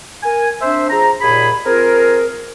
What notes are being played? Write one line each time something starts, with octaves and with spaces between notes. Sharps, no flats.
A#4 G#5
C4 D4 C5 E5
F3 G#4 A#5
D#2 A#2 G#4 B5
C4 F4 G#4 A#4